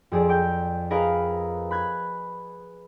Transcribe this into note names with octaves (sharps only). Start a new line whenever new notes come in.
F2 G#4 D5
G5 D6
G#4 A#4 B4 D#5 F5 A#5
B5 F#6 G#6